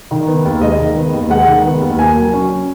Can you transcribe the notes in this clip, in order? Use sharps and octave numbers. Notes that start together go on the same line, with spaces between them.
D#3
B3
D#2
G#3 D#5
D#3
B3
D#2
G#3 F#5
D#3
B3
D#2
A#3 G#5
F#3
C#4